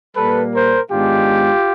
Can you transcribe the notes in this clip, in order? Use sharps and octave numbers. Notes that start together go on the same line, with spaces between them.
A#2 G3 A#3 A4 B4
A#4 C5
G#2 D#3 G#3 B3 D4 F4 G4